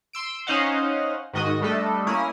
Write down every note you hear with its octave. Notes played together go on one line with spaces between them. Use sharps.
C6 E6 D7
C#4 D#4 C5 D#5 F5 F#5
G#2 D#3 F#4 D#5 D#6
G3 A3 D4 A4 D#5
A#3 C#4 E4 D#6 F6